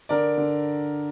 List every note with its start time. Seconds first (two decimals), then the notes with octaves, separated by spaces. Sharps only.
0.09 D3 A#4 D5
0.38 D3